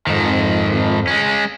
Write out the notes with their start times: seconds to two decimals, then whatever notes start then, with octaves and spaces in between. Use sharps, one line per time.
0.07 F2 G#2 D#3
1.07 G#3 C#4